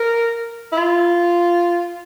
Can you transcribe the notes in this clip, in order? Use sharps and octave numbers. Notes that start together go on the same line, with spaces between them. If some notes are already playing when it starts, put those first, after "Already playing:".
Already playing: A#4
E4
F4